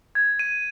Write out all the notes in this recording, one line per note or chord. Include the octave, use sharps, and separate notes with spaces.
G#6
D#7